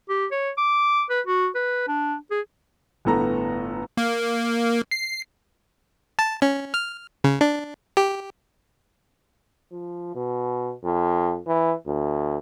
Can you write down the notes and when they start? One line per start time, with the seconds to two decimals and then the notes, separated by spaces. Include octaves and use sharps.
0.09 G4
0.31 C#5
0.57 D6
1.10 B4
1.27 F#4
1.55 B4
1.88 D4
2.31 G#4
3.05 G1 A2 B3 A4 A#5
3.97 A#3
4.91 C7
6.19 A5
6.42 C#4
6.74 F6
7.24 C#3
7.41 D4
7.97 G4
9.72 F3
10.15 B2
10.83 F2
11.47 E3
11.86 D2